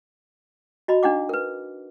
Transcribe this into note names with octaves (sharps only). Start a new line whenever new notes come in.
F#4 D#5 A#5 B5
D4 D#4 F#5 D6
A#4 B4